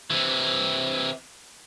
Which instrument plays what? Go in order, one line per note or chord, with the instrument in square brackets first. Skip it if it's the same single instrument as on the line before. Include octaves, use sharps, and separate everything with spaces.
[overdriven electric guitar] C3 E3